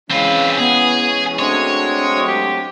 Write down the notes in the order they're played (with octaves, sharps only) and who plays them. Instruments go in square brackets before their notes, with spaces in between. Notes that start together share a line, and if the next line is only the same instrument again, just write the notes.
[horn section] E3 G#3 C#4 [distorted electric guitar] C4 B4 [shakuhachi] F5
[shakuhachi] B3 [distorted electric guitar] G#4
[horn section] F#3 A3 C4 [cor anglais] G#3 [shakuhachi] D4 [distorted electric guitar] C#5
[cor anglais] G4